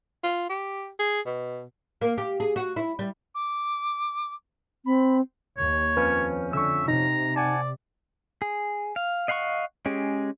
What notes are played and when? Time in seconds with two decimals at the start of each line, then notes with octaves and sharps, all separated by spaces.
0.23 F4
0.49 G4
0.99 G#4
1.26 B2
2.01 A#3
2.18 G4
2.40 G#4
2.56 F#4
2.76 E4
2.99 G3
3.34 D6
4.86 C4 B5
5.58 D#2 C#5
5.97 F2 F3 C#4 B4
6.53 D3 E5 C#6 E6
6.88 C3 D#4 A#5
7.36 D5 F#5 G#5 A5
8.42 G#4
8.96 F5
9.28 D#5 F5 F#5 B5 C#6
9.86 G#3 C#4 G4 G#4